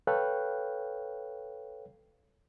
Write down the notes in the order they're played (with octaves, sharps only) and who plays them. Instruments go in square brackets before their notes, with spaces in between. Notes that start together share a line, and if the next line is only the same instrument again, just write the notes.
[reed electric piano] A4 B4 C#5 F5 G5 F#6